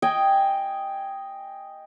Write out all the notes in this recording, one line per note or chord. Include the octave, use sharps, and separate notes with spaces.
D#5 G5 G#5